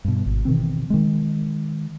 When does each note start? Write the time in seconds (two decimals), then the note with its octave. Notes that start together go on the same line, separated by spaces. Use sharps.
0.04 G2 B2
0.26 G#1
0.45 B2 D#3 E3 C4
0.90 D#3 G#3